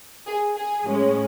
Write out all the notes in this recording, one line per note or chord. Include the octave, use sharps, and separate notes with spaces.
G#4
G#4
A2 G#3 C#4